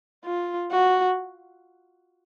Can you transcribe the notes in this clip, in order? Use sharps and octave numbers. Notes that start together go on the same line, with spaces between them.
F4
F#4